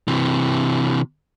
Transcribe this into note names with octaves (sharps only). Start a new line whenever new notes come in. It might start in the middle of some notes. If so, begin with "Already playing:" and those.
C3 E3